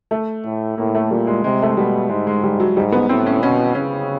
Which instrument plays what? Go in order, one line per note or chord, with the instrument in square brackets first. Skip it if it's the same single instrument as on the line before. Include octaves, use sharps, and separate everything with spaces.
[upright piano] A3
[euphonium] A2
[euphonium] A2 [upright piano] A#3
[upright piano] A3
[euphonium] A#2 [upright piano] G3
[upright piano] G#3
[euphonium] C3 [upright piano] G#3
[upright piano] A3
G#3
[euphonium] B2 [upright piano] G3
[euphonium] G#2 [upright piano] G#3
[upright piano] G#3
G3
F#3
[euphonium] G#2 [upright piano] G3
[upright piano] B3
[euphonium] A2 [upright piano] C4
[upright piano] C#4
[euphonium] B2 [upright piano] C#4
[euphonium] C#3 [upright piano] C#4